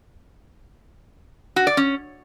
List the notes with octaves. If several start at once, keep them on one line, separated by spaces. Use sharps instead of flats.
F#4
D5
C#4